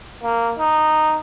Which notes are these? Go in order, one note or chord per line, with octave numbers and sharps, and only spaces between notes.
A#3
D#4